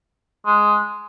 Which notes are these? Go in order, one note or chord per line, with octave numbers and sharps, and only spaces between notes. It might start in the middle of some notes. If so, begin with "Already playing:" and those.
G#3